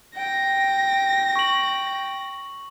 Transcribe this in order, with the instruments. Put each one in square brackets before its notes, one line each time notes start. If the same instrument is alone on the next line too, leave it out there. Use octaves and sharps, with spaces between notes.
[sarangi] G5 [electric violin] A#6
[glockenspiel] C#6 F#7